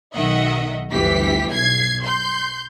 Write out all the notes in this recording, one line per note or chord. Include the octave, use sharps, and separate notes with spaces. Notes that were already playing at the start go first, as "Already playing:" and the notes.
B1 D#3 D#5 E5 F#5
G1 D2 E3 G4 B6
B1 G#6 C7
C6 G6